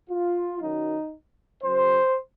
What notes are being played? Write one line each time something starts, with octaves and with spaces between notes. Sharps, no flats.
F4
F#2 D#3 F#3 D#4
F#2 C#3 F#3 C5